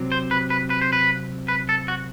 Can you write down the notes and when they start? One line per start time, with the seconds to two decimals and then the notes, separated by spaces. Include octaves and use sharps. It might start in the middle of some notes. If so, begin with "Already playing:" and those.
Already playing: C3 F#3 C4
0.12 C5
0.31 B4
0.50 B4
0.70 B4
0.82 C5
0.93 B4
1.48 B4
1.69 A4
1.88 F#4